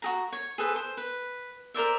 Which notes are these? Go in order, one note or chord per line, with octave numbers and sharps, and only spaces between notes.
F#4 G#4 A#5
C#5
G#4 A4 B4 C5
C5
B4
A#4 C5 D5 E5